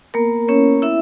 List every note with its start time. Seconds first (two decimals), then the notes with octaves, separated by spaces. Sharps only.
0.14 A#3 B3 A#4
0.48 C#4 E4 C#5
0.82 E4 E5